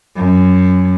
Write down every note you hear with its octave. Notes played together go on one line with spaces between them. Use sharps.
F#2